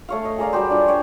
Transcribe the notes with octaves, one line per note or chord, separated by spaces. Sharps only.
A3 C#5 F5
D#5
G#4 A#4 D5 F5
G3 F#4 G4 C5
D4 F4
C#5 D5 G5